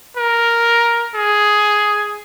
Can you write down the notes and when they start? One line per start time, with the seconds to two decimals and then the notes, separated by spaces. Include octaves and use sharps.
0.17 A#4
1.15 G#4